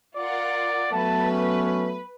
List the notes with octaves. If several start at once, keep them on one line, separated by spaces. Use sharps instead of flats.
F4 A#4 D5 F#5
F#3 A3 B3 B4 A5
C#4